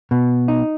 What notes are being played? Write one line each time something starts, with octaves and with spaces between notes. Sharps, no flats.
B2
D#4